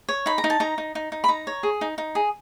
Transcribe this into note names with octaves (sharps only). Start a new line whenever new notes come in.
C#5
D#4 B5
A#5
D#4
A5
D#4 A#5
D#4
D#4
D#4
B5
D#4 A#5
C#5
G#4
D#4
D#4
G#4